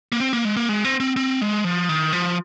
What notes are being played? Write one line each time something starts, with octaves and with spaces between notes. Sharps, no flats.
A#3
C4
A#3
G#3
A#3
G#3
C4
C4
C4
G#3
F3
D#3
F3